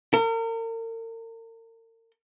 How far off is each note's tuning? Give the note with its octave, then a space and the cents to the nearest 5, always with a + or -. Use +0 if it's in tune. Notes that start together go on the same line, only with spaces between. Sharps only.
A#4 -40